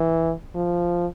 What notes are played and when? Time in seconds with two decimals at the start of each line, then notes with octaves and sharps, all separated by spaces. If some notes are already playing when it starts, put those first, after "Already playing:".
Already playing: E3
0.55 F3